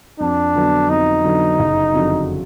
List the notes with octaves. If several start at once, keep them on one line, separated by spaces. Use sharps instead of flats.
F2 D4
D3 F#3 B3
F2 D#4
D3 F#3 B3
F#1
F2 D3 F#3